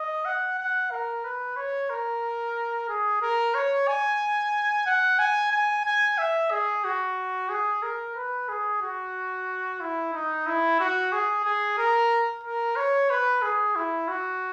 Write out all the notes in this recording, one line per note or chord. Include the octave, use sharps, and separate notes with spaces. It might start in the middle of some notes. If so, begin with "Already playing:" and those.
Already playing: D#5
F#5
F#5
A#4
B4
C#5
A#4
G#4
A#4
C#5
G#5
F#5
G#5
G#5
G#5
E5
G#4
F#4
G#4
A#4
B4
G#4
F#4
E4
D#4
E4
F#4
G#4
G#4
A#4
A#4
C#5
B4
G#4
E4
F#4